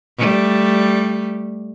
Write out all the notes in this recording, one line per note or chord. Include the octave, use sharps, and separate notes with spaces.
G3 A3